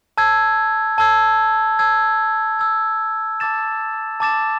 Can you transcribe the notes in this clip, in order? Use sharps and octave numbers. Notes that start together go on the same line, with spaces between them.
A5 E6 G#6
A5 E6 G#6
A5 E6 G#6
A5 E6 G#6
A5 D6 A6 E7
A5 D6 A6 E7